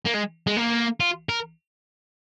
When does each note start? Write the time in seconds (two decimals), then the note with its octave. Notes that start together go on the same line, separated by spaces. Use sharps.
0.05 A#3
0.14 G#3
0.47 G#3
0.57 A#3
1.00 F4
1.29 A#4